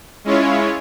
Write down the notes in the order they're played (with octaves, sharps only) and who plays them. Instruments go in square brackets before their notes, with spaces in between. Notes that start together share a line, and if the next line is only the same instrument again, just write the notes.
[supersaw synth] G#3 C#4 E4 F4 C#5